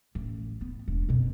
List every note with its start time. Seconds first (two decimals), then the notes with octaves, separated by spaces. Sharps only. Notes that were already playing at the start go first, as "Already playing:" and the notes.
0.15 A1
0.61 B3
0.88 E1 D4
1.09 F2 B2